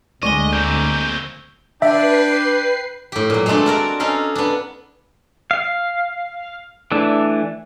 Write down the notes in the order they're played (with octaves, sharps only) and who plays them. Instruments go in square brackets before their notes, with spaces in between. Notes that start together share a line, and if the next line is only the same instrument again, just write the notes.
[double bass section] D2 [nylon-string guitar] G3 G#3 D5 [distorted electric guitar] D#5 [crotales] C#6 G7
[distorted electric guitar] A#3 C4 [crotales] G6
[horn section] D4 [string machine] B4 C7 [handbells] E5 [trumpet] G5
[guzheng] A2 G4
A#2 F#3
G#3 A3 C4 D4 A4
F#4 A#4 D5 A#5
C#4 D#4 A4 F5
B3 D4
[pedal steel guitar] F5
E3 A3 D4